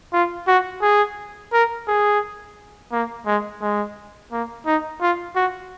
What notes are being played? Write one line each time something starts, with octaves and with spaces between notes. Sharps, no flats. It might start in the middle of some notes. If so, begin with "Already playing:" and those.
F4
F#4
G#4
A#4
G#4
A#3
G#3
G#3
A#3
D#4
F4
F#4